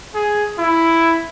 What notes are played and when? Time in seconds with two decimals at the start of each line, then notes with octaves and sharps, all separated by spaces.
0.14 G#4
0.58 E4